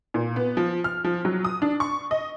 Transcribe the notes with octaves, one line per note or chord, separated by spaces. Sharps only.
A#2
B3
F3
F6
F3
F#3
D#6
D4
C#6
D#5